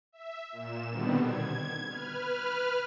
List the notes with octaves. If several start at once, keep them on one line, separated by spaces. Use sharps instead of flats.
E5
A#2 E7
B2 D3 D#3 G3 B3 C4
G#6
B4 F6